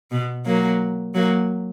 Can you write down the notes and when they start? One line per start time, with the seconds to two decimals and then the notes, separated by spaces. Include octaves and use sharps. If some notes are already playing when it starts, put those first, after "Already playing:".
0.11 B2
0.45 F#3 A#3
1.14 F#3 A#3